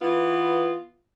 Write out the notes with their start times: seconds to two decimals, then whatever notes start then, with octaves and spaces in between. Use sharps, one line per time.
0.02 E3 B3 F4